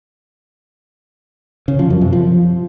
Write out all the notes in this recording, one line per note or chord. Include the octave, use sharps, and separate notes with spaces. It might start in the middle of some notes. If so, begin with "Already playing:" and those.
C#3
F3
F#2
C3
F3